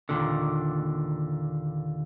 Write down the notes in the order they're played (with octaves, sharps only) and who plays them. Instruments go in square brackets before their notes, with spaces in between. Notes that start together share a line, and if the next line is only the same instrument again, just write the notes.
[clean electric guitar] D#2 A#2 D3